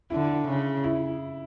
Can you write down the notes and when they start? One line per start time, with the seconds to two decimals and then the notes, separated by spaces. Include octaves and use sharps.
0.10 D3 E4
0.47 C#3
0.84 E4